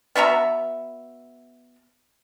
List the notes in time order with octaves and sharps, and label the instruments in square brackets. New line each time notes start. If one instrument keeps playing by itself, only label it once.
[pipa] B3 F#4 E5 A#5